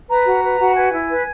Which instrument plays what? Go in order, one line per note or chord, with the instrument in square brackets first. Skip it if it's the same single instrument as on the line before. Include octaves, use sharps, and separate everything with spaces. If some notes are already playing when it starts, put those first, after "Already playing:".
[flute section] B4 A#5
F#4
B4
F#4
B4 G#5
E4
B4